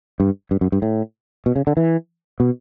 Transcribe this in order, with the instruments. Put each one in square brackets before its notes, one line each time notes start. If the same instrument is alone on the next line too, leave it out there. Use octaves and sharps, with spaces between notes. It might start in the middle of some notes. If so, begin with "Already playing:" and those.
[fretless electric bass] G2
G2
F#2
G2
A2
B2
C#3
D3
E3
B2